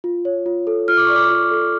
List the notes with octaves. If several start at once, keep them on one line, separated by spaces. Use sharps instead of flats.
F4
C#5
F4
A4
F4 F6
D6
D5 C#6
D6
F4
A4